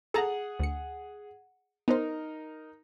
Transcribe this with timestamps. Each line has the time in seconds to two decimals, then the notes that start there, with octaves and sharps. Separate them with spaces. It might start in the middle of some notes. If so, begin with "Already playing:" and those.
0.14 G#4 A4 F#5 A5 A#5
0.60 D2 C#7
1.88 B3 D#4 A#4 C5